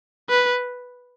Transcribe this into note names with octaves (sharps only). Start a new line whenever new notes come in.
B4